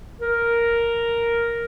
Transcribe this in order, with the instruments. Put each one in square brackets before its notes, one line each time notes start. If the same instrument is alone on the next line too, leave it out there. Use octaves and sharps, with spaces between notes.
[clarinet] A#4